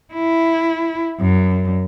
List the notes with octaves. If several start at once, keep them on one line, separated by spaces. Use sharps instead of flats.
E4
F#2